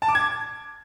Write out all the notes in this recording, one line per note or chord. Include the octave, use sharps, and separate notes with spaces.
A5
D6
G#6